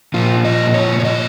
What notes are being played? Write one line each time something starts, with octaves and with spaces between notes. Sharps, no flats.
A#2 F3 F4
D#5
C#5
C#5
D#5